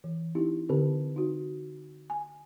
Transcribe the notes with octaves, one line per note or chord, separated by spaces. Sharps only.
E3
C4 D#4 E4 G4
D3 C4 G4 A#4
D#4 F#4
G#5